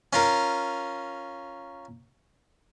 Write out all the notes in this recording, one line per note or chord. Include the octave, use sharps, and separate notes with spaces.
C#4 F4 A#4